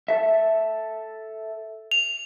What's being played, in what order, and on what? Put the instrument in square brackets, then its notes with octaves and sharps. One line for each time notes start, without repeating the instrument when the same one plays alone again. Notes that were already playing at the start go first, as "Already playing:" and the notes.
[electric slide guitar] A4 E5
[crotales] F7